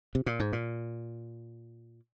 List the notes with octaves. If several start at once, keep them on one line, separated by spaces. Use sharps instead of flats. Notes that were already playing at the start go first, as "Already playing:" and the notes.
C3
A#2
G#2
A#2